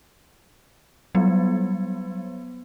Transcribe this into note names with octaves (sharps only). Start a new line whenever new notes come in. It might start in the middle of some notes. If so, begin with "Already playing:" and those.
F#3 G3 B3